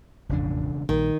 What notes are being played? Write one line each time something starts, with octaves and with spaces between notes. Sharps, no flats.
E1 A1 F2 C#3 D4
A#1 D#3 G3